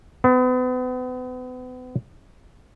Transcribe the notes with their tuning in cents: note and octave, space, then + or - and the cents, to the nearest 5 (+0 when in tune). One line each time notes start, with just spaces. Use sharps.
B3 +40